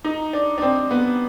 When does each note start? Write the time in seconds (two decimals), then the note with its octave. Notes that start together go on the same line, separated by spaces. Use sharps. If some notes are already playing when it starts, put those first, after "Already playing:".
0.04 D#4
0.33 D4
0.58 D4
0.62 C4
0.91 B3